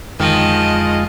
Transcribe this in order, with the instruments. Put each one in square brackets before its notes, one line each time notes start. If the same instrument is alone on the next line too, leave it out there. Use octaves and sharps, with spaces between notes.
[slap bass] F2 D3 C#4 [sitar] D#3 [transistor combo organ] G#3 F4 [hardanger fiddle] D#5 A5